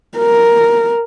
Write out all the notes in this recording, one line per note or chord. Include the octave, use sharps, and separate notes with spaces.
A#4